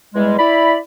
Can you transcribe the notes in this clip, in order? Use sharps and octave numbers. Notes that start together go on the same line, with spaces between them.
E2 E3 G3 G#3
E4 D5 B5